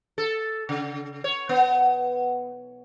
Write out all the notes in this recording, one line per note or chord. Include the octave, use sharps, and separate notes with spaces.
A4
C#3
C#5
B3